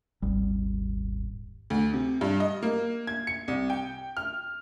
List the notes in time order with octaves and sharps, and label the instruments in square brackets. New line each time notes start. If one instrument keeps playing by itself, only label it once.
[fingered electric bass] D#1 G#1 G3
[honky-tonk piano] D2
C3
G2
D#5
A#3
G#6
C#7
C2
G5
F6